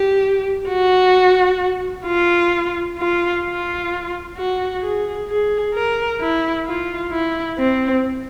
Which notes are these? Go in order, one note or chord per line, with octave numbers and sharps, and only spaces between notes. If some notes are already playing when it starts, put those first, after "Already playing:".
Already playing: G4
F#4
F4
F4
F4
F#4
G#4
G#4
A#4
E4
F4
E4
C4